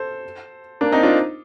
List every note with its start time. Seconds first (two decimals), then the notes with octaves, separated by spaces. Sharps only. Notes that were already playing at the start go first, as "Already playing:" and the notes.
Already playing: A4 C5
0.81 A#3 D4
0.92 C4 D#4
1.03 D4 F4